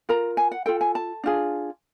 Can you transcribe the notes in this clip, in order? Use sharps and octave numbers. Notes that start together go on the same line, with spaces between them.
F4 A#4 A#5
G#5
F#5
F4 A4 G5
G#5
A5
D4 F4 G#4